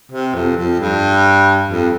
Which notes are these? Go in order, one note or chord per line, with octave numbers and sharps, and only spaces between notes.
C3
F2
F2
G2
F2